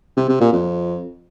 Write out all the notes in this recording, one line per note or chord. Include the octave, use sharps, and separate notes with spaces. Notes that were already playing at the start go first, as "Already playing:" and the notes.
C3
C3
A#2
F2